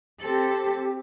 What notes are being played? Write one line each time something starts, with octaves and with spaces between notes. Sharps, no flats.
C4 G4 A4